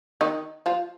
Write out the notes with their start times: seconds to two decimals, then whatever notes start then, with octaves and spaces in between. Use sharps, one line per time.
0.21 D#3 D#4
0.66 F3 F4